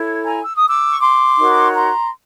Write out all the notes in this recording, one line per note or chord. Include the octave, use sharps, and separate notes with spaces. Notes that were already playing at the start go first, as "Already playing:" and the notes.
Already playing: E4 A4 C#5
G#5 A#5
E6
D#6
D6 E6
C#6
C6 D6
D#4 F#4 A#4 C#5
A#5 C6